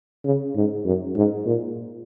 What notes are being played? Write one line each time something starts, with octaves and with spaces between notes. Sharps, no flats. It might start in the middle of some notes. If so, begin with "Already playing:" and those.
C#3
G#2
F#2
G#2
A#2